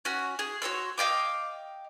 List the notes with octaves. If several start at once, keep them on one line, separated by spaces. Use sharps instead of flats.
C#4 F#4
G#4
F#4 C#5 C6 E6
D#5 F5 G5 D6